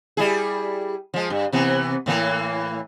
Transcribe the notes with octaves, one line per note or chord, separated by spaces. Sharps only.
G3 E4 G#4
F3 G#3
G2
C3 E3 B3
A2 E3 A#3